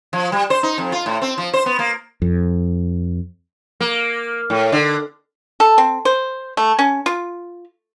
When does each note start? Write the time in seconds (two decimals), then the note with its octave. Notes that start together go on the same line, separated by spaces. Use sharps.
0.13 F3
0.32 G3
0.50 C5
0.63 D#4
0.78 F2
0.92 F4
1.06 A2
1.22 C4
1.38 F3
1.53 C5
1.66 B3
1.79 A#3
2.22 F2
3.80 A#3
4.50 A2
4.72 D3
5.60 A4
5.78 C4
6.05 C5
6.57 A3
6.79 C#4
7.06 F4